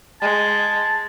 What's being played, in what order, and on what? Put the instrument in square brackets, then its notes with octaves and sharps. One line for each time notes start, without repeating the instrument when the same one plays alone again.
[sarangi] G#3 [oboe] A5